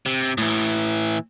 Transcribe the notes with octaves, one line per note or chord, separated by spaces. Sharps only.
C3
A2 E3